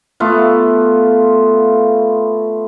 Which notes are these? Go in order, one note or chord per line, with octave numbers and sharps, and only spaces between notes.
A3 B3 F4